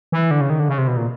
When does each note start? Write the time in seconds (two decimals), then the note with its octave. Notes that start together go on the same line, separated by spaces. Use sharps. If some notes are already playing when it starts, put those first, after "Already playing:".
0.12 E3
0.31 D3
0.41 C#3
0.50 D#3
0.60 D3
0.69 C#3
0.78 C3
0.88 B2
0.97 A#2